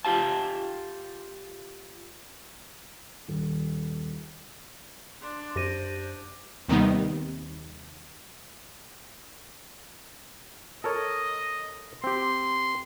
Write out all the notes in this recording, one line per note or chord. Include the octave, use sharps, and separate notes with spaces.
F4 G4 F5 A5
D#1
D4 C6
F#2 G4 C5 A#6 D#7
D#2 C3 D#3 G3 B3 D#4
A4 A#4 C#5 D#5
C4 G4 C6